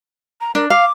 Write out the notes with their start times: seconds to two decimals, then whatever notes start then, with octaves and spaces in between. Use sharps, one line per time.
0.41 A#5
0.55 D4 A#4
0.70 F5 D6